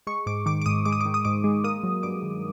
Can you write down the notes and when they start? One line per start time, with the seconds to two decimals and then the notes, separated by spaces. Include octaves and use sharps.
0.07 G#3 C#6
0.26 G#2 D6
0.46 D#3 D6
0.62 D6
0.66 G#2 D#6
0.85 G#3 D6
0.93 D#6
1.01 D#3 D6
1.14 D#6
1.25 G#2 D6
1.44 G#3
1.64 A#3 D#6
1.83 F#3
2.03 G2 D6
2.23 D#3